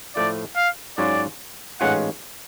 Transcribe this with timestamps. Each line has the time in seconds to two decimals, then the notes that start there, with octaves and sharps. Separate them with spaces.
0.16 A2 F3 A3 F4 D5
0.56 F5
0.98 G#2 F#3 C#4 F4 D5
1.81 A1 G#2 G#3 C#4 F4 F#5